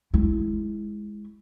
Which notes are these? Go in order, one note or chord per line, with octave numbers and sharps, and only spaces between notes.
G#3 E4